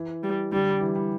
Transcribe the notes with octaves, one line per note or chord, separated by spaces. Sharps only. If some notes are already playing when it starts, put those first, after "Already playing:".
Already playing: E3
G3
D3 G3
G3
E3
G3